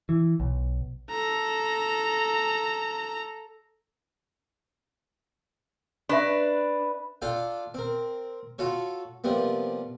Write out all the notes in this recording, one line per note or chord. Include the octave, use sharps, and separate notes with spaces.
E3
B1
A4 A#5
D4 B4 E5 C#6
D4 F4 A4 F5 G5
C4 A#4
F4 F#4 A4 C#5
C3 F3 G3 A#3 B3